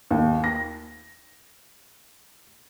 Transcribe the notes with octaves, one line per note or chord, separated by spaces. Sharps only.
D#2
A#6